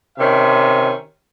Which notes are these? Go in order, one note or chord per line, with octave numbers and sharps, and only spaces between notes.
C3 D#3 C#4 E5